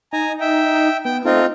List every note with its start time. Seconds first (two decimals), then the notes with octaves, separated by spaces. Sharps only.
0.13 D#4 G#5 A#5
0.40 E5 G5
1.05 B3 G5
1.25 A3 C4 D#4 F4